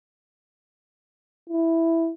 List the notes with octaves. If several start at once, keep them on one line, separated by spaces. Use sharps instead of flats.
E4